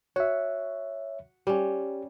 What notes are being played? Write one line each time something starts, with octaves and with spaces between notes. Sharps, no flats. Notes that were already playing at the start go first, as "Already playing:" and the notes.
F#4 C#5 E5
G3 C#4 G4